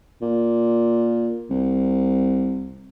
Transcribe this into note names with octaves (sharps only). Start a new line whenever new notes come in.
A#2
C2